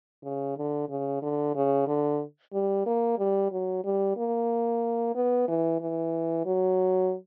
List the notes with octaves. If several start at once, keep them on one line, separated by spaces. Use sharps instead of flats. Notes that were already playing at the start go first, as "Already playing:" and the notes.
C#3
D3
C#3
D3
C#3
D3
G3
A#3
G3
F#3
G3
A#3
B3
E3
E3
F#3